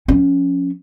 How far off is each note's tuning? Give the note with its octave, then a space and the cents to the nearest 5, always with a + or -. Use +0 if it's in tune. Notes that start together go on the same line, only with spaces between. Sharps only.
F3 +25 C#4 +5